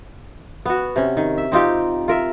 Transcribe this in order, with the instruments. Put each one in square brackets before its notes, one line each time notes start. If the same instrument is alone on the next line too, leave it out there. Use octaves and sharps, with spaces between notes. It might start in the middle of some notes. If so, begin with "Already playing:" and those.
[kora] B3 F#4
C3 C#4
D#3
E5
C4 D#4 F4 G4
F4 A#4 E5